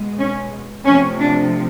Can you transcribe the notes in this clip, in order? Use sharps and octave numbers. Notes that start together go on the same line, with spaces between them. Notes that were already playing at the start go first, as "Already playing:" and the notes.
Already playing: B2 G#3
C#4
C3 F3 A3 C#4
D4